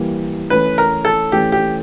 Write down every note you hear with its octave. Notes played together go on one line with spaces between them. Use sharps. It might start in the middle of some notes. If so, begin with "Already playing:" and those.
Already playing: E3 G3 A#3
E3 A3 C#4 B4
A#4
A4
E3 A3 C#4 G4
G4